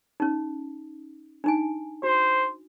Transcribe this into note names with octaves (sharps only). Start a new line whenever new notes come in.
C#4 D#4
D4 D#4 G#5
F#4 C5